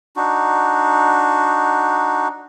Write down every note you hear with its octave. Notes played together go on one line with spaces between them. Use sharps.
D4 D#4 F#4